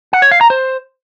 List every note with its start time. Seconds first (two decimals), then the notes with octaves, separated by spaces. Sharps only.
0.13 F#5
0.22 C#5
0.31 F5
0.41 A#5
0.50 C5